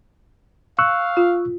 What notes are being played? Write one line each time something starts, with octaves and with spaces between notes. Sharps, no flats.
F5 C#6 E6 F#6
F4